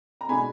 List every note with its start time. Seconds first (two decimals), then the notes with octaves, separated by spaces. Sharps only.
0.21 A#5
0.28 B2 G#3 D4 G#5 B5